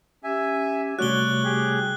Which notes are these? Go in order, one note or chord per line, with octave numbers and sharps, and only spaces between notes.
C#4 G4 E5 G#5
C3 G3 A3 F#4 C#5 D5 F#6 G7
G4 G#4